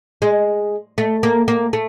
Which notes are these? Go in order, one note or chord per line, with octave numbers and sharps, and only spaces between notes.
G#3
A3
A#3
A#3
A3